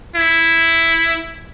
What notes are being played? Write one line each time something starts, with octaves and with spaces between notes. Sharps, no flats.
E4